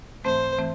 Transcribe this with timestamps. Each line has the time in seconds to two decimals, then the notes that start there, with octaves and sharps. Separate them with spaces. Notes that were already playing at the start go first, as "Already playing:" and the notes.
0.24 G#2 E3 A3 C4 C5
0.58 E3 A3 C4